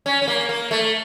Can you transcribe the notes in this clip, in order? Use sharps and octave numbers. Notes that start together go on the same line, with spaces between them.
C#4
C#4
A#3
A#3
A3